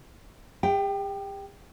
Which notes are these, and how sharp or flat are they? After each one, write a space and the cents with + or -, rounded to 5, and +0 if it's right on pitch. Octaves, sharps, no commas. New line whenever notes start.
G4 +40 G5 +0